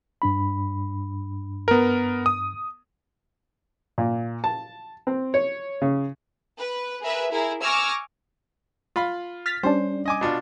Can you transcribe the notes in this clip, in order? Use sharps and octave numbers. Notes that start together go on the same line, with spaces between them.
G2 D4 B5
B3 A#4
D#6
A#2
A5
C4
C#5
C#3
B4
G#4 A#4 B4 E5
E4 G#4 A#4
G#5 C#6 D6 E6 F6 A#6
F4 F5 B5
F6 A6 B6
G3 C#4 D4 C5
D#5 G#5 D6
B2 D4 F4